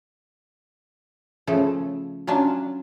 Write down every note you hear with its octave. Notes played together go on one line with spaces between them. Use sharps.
C#3 F3 A3 A4
F#3 C#4 D4 F4 A5